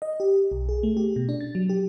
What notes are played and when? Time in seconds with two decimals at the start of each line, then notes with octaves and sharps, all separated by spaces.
0.02 D#5
0.20 G4
0.52 B1
0.69 G#4
0.83 A3
0.97 G4
1.16 B2
1.29 D4
1.41 A6
1.55 F#3
1.69 G4